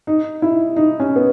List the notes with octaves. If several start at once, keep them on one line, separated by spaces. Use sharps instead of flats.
D#4
E4
D#4
C#4
B3